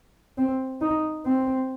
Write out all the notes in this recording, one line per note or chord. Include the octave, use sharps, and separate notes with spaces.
C4
D#4
C4